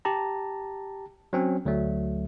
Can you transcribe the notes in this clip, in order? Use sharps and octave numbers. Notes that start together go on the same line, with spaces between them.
G4 A5 A#5
F#3 C4 C#4
D2 F#3 A3